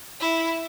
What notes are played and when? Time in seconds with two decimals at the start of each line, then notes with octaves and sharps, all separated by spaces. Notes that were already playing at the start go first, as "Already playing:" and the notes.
0.20 E4